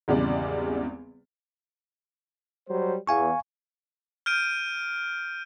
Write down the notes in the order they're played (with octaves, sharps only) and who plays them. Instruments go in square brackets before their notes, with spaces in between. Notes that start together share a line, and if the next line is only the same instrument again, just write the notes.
[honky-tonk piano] G#1 E2 C#3 G3 G#3 D5
[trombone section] F#3 G3 C5
[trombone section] E2 [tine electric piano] F5 G#5 C#6
[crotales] F6 G6 D7 D#7